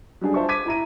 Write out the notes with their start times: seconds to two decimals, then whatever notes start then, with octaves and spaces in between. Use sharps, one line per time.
0.21 F#3 G3 D4 G#4
0.34 F4 C5 E5 A5 C#6
0.49 D6 G#6 B6 D#7
0.66 E4 A#5 D#7